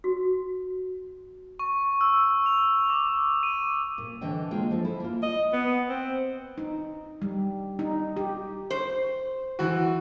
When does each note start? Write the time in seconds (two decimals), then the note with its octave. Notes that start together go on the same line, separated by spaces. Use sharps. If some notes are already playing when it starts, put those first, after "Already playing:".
0.04 F#4
1.59 C#6
2.01 E6
2.46 F7
2.90 D6
3.43 D#7
3.98 A#2
4.21 D3 E3 D#5 G5
4.51 G#3 A#3 F4 G#4 G5
4.71 F3 G#3 A4
4.85 E4
5.00 A#3 F4
5.23 D#5
5.53 B3
5.89 C4
6.58 D#4
7.22 G3
7.79 D#4
8.16 G4
8.70 C5
9.59 E3 F#4